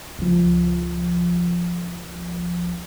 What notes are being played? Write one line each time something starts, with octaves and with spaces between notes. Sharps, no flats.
C#2 F3